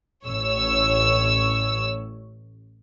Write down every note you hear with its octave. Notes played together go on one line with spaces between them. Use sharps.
A1 C#5 E6